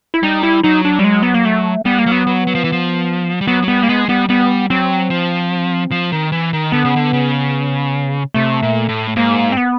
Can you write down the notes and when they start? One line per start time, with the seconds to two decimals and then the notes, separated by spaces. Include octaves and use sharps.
0.14 E4
0.23 G3 D#4
0.43 E4
0.63 F#3 D#4
0.85 D4
0.99 G3
1.04 G#3
1.23 B3
1.34 A#3
1.45 A3
1.85 G3 B3
1.98 A#3
2.06 F#3
2.12 B3
2.27 F#3
2.47 F#3
2.55 F3
2.64 E3
2.72 F3
3.41 G3
3.47 F#3 B3
3.63 F#3
3.68 G3 B3
3.83 A#3
3.89 G#3 B3
4.09 G3 B3
4.29 G3 B3
4.70 F#3 C4
5.10 F3
5.91 F3
6.12 D#3
6.32 E3
6.53 D#3
6.72 D3 B3
6.85 C#3
6.96 D3
7.13 C#3
8.34 C3 A3
8.63 A#2
8.89 A2
9.16 G#2 A#3
9.52 C4
9.57 B3